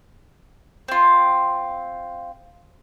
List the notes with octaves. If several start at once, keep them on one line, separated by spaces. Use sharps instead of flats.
C4 F4